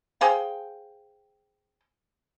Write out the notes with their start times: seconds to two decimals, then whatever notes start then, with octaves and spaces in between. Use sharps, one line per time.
0.21 G#4 C5 F5 G5